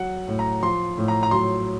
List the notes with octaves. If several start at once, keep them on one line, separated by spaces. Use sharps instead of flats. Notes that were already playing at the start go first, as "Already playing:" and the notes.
Already playing: F#3 F#5
A2
A#5
F3 C6
A2
A#5
A#5
F#3 C6